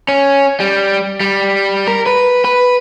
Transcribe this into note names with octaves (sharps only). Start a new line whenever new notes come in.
C#4
G3
G3
A#4
B4
B4